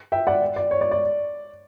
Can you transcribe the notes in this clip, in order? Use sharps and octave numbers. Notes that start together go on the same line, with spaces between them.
E5 G5
D5 F#5
D5
C#5
D5
D5